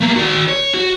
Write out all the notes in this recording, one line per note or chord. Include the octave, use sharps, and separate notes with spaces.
A3 A#3
F#4 D5
C#5
F#4